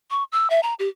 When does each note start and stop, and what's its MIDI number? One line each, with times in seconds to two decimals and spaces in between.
0.11 0.24 85
0.32 0.50 88
0.50 0.60 76
0.63 0.74 82
0.79 0.89 67